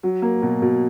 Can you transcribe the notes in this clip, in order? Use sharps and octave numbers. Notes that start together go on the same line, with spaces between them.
F#3
A#3
B2
B2